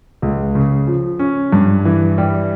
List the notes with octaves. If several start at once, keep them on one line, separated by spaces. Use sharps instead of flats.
C#2
C#3
F3
C#4
G2
E3
G3